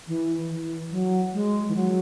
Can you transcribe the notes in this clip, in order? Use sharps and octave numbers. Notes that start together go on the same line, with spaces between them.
E3
E3
F#3
G#3
E3
F#3